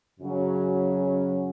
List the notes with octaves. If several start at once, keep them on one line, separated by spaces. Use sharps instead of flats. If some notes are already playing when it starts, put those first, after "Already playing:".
F#2 C#3 F#3 C#4